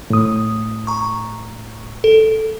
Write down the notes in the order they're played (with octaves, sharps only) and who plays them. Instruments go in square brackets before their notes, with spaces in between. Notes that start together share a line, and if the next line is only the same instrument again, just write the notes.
[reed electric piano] A2 D#6
[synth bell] A#5 C#6
A4